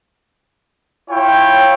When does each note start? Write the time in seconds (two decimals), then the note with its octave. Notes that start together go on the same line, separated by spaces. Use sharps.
1.10 E4 F4 C#5 G5